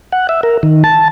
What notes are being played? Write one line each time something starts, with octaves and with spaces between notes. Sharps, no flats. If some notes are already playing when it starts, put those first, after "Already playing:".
F#5
E5
A#4
D#3
A5